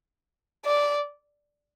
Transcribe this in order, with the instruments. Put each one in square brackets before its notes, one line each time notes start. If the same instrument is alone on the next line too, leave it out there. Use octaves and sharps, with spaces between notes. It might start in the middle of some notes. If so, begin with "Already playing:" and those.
[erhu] D5